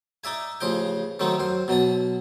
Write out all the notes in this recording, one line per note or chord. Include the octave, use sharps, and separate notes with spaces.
D#4 D5 E5 G#5
A1 C#3 F3 D#5 G5
D#3 F#3 A3 C4 D#4
F#2 C5
B2 F#3 A5 D#6